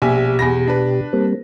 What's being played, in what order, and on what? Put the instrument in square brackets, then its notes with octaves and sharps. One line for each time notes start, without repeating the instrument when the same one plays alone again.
[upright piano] A#1 E5 G#5 [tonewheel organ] B2 G4
[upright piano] E2 B5 A#6
D4 B4
[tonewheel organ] G3 A#3 C4